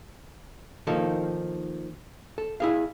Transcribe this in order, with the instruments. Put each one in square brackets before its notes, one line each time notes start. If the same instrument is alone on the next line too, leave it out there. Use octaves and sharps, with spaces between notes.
[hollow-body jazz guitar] D#3 F3 A#3 D#4 A4
A4
E4 G#4 F5